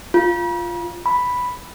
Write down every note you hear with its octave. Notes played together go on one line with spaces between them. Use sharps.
F4
B5